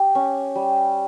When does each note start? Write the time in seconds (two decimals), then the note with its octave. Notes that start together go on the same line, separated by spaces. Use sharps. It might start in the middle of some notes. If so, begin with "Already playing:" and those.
Already playing: G4
0.15 C#4
0.55 G3